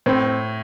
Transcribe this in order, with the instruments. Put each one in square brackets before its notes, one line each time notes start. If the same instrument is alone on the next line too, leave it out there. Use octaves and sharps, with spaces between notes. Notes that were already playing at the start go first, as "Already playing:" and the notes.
[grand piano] A2 [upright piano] C4